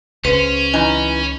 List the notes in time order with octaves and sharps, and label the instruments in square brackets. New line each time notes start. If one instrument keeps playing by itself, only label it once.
[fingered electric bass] C#2 C#3 [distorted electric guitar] C#4 [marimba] B4 [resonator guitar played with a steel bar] C5
[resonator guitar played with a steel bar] E3 D#4 [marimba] G#5